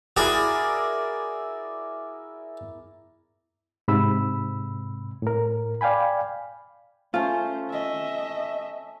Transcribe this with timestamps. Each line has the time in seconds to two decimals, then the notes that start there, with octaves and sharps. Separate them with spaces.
0.17 E4 F#4 G#4 A#4 D5
3.88 G#2 C3 B5 E6
5.22 A2 A#4
5.81 D5 F5 G5 G#5 B5
7.14 A3 C#4 F4 C5
7.70 D#5 E5